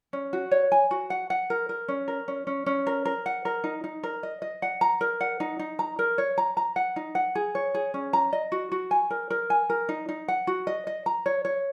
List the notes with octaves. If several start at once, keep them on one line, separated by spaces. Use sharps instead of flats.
C#4
F#4
C#5
G#5
F#4
F#5
F#5
A#4
A#4
C#4
A#4
C#4
C#4
C#4
A#4
A#4
F#5
A#4
D#4
D#4
A#4
D#5
D#5
F#5
A#5
A#4
F#5
D#4
D#4
A#5
A#4
C#5
A#5
A#5
F#5
D#4
F#5
G#4
C#5
G#4
C#4
A#5
D#5
F#4
F#4
G#5
A#4
A#4
G#5
A#4
D#4
D#4
F#5
F#4
D#5
D#5
A#5
C#5
C#5